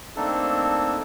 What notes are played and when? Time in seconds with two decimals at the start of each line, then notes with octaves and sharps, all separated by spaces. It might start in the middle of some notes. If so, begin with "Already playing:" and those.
0.16 A3 A#3 C4 D4 D#4 A4